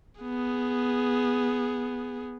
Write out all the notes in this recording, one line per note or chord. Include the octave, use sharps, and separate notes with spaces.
B3 G#4